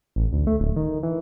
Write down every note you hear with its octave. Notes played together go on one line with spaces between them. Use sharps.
A1
D2
A3
D1
D#3
E3